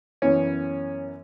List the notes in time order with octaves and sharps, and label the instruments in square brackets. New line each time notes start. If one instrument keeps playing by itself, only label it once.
[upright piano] F#2 E3 B3 [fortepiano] C#4